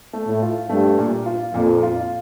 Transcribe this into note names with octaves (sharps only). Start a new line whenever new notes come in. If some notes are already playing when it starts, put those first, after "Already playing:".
A3
A2
F4
G2 A3
A#2
F4
F2 A#2
F4